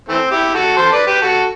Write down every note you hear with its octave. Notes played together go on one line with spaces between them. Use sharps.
E3 A3 C4
E4 G4
F#4 A4
A4 C5
B4 D5
G4 B4
F#4 A4